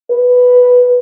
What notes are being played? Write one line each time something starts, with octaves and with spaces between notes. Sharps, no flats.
B4